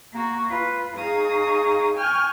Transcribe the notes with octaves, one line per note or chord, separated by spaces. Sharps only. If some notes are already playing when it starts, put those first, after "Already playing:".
A#3 F#4
F4 B4
D#4 G#4 F5 C#6 D#6
G5 G#5 C#6 F6 G6